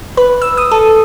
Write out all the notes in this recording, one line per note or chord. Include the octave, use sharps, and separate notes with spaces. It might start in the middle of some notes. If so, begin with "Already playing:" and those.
B4
E6
D#6
A4